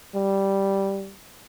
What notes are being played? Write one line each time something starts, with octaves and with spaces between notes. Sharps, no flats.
G3